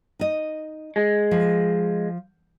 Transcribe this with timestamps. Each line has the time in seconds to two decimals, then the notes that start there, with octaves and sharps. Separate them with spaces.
0.19 D#4 D#5
0.96 G#3
1.31 F3